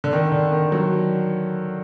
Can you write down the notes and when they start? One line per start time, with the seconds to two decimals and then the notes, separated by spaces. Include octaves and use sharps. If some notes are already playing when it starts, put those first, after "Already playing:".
0.04 D3
0.13 D#3
0.32 D3
0.52 D#3
0.72 F#3